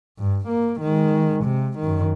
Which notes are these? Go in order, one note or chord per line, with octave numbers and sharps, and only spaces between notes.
G2
A#3
D#3 G#3
C3
F#2 D#3